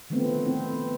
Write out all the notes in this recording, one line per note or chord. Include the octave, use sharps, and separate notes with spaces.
D3 D#3 F3 A3 B3 C4
C4 E4
B3